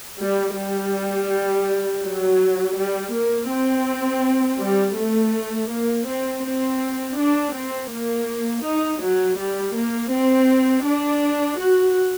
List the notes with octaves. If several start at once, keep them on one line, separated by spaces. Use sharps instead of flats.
G3
G3
F#3
G3
A#3
C4
G3
A3
A#3
C4
C4
D4
C4
A#3
D#4
F#3
G3
A#3
C4
D4
F#4